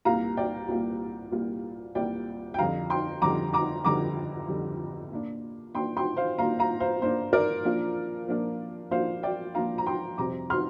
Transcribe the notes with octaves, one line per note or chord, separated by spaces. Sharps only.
C2 A#2 G3 A#3 F4 F5 A#5
D5 G5
C2 A#2 G3 A#3 F4
C2 A#2 G3 A#3 F4
C2 A#2 G3 A#3 F4 D5 G5
G5
F2 D3 G3 F5 A#5
G5 C6
F2 D3 G3 A#5 D6
A#5 D6
F2 D3 G3 A#5 D6
F2 D3 G3
A#2 A#3 D4
A#2 A#3 D4 G5 C6
G5 C6
C5 F5
A#2 A#3 D4 F5 A#5
F5 A#5
C5 F5
A#2 A#3 D4 C5
A#4 D5
A#2 F3 A#3 D4 F4
A#2 F3 A#3 D4 F4
A#2 F3 A#3 D4 F4 C5 F5
D5 G5
A#2 F3 A#3 D4 F4 F5 A#5
A#5
G5 C6
F2 C3 G3 C4 A#5 D6
C6 F6